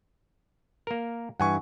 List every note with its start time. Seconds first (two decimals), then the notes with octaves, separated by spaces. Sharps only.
0.87 A#3 A#4
1.40 G2 E3 F#5 G#5 C#6